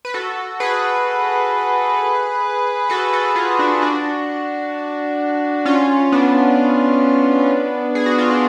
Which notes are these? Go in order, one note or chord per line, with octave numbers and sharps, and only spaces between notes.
B4
F#4 A4
G#4 B4
F#4 A4
F#4 A4
F4 G#4
D4 F#4
D4 F#4
C#4 F4
B3 D4
G#4
F#4
F4
D4